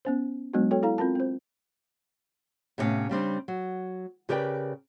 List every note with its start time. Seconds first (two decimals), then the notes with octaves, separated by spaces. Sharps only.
0.05 B3 C#4 C5
0.54 F#3 G#3 B3 D4 F#4
0.71 F#4 A4 C#5 G5
0.83 E4 A4 F5 A#5
0.98 C4 F4 A#4 A5
1.15 C4 C5
2.78 A2 C3 F3 B3 C#4 F5
3.09 C#3 G3 C4 D4
3.48 F#3
4.29 C#3 G4 A#4 B4 D5 G5